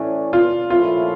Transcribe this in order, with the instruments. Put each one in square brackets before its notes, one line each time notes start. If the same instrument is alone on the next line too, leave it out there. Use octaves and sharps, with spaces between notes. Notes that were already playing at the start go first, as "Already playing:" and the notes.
Already playing: [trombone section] A2 E3 A3 C#4 [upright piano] D4
[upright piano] F4
[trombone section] A#2 F3 A3 C#4 E4 [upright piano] F4